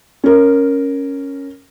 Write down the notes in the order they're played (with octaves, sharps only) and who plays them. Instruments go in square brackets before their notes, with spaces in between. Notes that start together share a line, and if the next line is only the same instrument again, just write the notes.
[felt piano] C#4 A#4